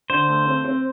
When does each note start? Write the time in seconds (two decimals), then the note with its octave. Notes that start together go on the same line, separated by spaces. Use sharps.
0.10 D3 C5
0.28 A3
0.46 C4
0.64 C4